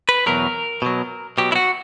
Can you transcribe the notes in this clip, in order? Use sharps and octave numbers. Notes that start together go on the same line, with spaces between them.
B4
E2 B2 F#3 A#4
B2 F#3
B2 F#3 G4
E4
F#4